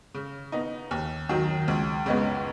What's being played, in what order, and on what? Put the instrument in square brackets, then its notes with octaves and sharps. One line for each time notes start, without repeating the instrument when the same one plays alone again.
[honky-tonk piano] C#3
B3 D#4
D#2
D#3 F#3
C#2
C#3 G#3 B3